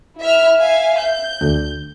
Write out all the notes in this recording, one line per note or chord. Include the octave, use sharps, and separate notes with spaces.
E4 E5 F6
E5 F5 G#5
G6
D2